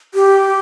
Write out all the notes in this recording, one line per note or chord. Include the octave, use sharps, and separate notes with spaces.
G4